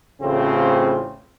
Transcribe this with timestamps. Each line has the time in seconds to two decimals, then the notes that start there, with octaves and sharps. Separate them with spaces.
0.22 A1 A2 C#3 C4 F4 C5